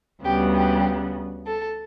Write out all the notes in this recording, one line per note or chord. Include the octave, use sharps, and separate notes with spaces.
D2 C#3 G3 B3 G4
G4
A4